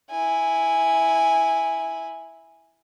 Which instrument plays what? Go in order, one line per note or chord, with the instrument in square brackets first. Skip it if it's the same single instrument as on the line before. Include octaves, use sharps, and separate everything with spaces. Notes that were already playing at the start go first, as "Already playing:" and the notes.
[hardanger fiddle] E4 G#5